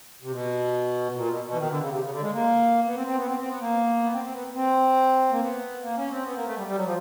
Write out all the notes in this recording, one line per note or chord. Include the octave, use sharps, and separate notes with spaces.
C3
B2
A#2
B2
B2
E3
D#3
D3
C#3
C3
C#3
D3
G#3
A#3
B3
C4
C4
B3
C4
C4
B3
A#3
B3
C4
C4
B3
C4
A#3
B3
A#3
C#4
C4
B3
A#3
A3
G3
G3
F#3
F3